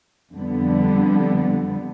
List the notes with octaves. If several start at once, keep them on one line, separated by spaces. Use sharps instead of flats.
F2 D3 G3 B3